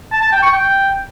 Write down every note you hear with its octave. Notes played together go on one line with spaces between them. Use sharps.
A5
A5
G5
C#6
G5